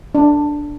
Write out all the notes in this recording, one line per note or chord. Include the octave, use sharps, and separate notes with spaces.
D4